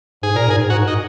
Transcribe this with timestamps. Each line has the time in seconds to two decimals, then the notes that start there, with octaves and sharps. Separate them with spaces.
0.23 G#2 G#4
0.35 A#2 A#4
0.47 G#2
0.50 G#4
0.59 G#2
0.70 G#2 F#4
0.87 D#4